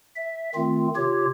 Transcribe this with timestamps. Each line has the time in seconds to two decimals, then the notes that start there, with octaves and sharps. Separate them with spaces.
0.16 E5
0.55 D#3 A3 C4 F4
0.96 C3 F4 G4 C#5